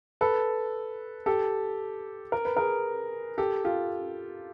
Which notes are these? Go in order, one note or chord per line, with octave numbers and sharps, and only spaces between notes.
A4 B4
G4 A4
A#4
B4
G#4 A#4
G4 A4
F4 G4